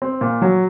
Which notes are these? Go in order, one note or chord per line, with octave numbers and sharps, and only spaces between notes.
C4
A#2
F#3